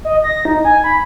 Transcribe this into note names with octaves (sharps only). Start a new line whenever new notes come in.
D#5
A#6
D#4
G#5
B5